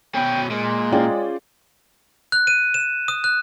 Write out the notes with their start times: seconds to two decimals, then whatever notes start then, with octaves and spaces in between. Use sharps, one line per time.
0.15 B2 C#4 G5
0.50 A#2 G#3
0.92 C#4 F4 G#4 D5 G5
2.32 F#6
2.47 D#7
2.74 E7
3.08 D#6
3.24 F#6